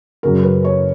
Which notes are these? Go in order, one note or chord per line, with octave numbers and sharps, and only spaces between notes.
F#2 C#3 F#3 A#4
B4
C#5